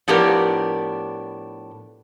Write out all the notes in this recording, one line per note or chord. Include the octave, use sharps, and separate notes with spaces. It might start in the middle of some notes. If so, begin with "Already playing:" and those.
A2 F3 B3 D4 G4 A#4